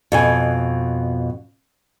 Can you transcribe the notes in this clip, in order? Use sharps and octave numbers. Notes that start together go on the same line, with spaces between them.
F2 B2 G#5